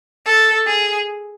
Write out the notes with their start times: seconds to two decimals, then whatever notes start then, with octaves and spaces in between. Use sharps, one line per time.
0.26 A4
0.67 G#4